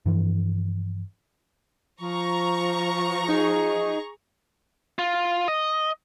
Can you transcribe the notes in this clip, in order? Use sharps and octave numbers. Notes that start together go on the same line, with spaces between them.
G2 E3 F3
F3 A#5 C#6
D#4 G#4
F4
D#5